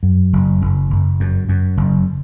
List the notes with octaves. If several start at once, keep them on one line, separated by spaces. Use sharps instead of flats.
F#2
F#1
F#1
F#1
F#2
F#2
F#1